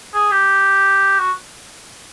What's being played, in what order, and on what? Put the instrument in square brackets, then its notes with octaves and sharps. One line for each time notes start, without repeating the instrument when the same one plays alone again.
[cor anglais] G#4
G4
F#4